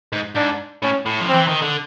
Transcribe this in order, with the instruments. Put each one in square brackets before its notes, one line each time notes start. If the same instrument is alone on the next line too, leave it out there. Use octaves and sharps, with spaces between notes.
[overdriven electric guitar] G#2
[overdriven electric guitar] G#2 [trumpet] D4
[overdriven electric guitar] A2 [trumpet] C#4
[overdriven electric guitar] A2
F3
[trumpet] C4
[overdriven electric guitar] E3
D#3
D3